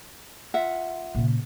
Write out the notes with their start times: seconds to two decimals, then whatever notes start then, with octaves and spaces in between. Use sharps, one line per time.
0.54 F4 E5 F#5
1.15 A#2 C#3